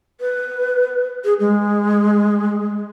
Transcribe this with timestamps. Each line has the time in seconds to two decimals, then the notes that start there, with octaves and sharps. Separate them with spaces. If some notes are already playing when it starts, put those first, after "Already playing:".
0.21 B4
1.25 G#4
1.40 G#3